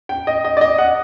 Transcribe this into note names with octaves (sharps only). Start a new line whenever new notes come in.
G5
D#5
D#5
D5
D#5
F#5